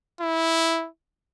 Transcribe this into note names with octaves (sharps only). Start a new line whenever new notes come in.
E4